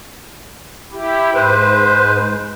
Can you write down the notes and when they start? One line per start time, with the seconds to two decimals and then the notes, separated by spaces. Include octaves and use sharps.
0.92 E4 G4
1.35 G#2 B4 C5